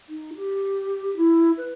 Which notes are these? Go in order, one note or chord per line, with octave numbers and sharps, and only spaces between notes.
D#4
G4
E4
B4